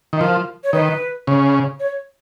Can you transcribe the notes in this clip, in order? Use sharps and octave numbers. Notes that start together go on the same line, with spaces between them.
D#3
F3 A#4
C#5
D#3 B4
C#3
C#5